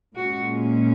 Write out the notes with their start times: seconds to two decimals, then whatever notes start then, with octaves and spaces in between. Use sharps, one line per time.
0.16 A#2 G#3 C#4 F#4